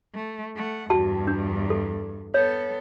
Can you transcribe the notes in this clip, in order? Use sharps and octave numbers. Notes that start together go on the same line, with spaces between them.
A3
A3 F#5
E2 G2 F#4 G5 A5
D4
A4
B3 A4 C#5